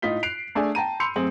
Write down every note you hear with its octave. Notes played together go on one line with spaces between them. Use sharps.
A2 D#4 F4 B6 G7
F#6 C7 D7 F7
A3 D4 G#4 G#5
G5 A5 A#5 D#7
B5 C6 E6 G6 C#7 F7
F#2 A3 C4 G#4 F#7